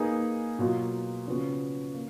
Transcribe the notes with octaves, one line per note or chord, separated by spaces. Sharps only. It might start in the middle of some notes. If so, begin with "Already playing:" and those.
Already playing: A#3 D#4 G#4 B4
B2 F#3 A#3 F4
C#3 F3 B3 F#4
A#3